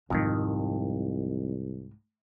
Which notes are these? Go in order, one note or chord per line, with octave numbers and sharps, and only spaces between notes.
C2 F2 G#2 D#3 G#3